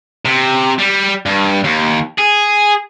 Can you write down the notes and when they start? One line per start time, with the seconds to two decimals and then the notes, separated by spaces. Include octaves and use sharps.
0.25 C3
0.79 G3
1.26 G2
1.64 D#2
2.18 G#4